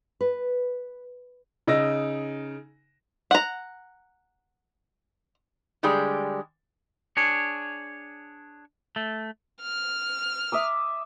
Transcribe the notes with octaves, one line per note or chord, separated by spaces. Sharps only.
B4
C#3 D#4 E6 A#6
F#5 A#5
D3 G3 G#3 G4 G#4 D5
D4 G#4 C#5
A3
F6
E5 D6 D#6